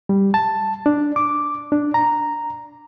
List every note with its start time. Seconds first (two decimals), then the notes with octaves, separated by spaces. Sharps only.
0.09 G3
0.34 A5
0.86 D4
1.16 D6
1.72 D4
1.94 A#5